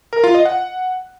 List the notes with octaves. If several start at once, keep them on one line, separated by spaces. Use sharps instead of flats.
A#4
F4
D#5
F#5